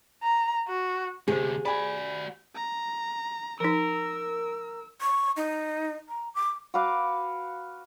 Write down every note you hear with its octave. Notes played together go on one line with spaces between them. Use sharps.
A#5
F#4
D2 C3 G4 G#4 C5
F#4 D5 G#5 B5
A#5
F3 D#4 A#4 E6
C#6
D#4
A#5
D6
F#4 B4 F5 D6